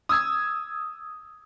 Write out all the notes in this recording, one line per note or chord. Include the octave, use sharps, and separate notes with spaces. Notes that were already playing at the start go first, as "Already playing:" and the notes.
D#6 E6 G#6